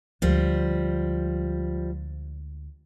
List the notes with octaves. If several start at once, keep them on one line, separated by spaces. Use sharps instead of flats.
D2 F3 G3 G#3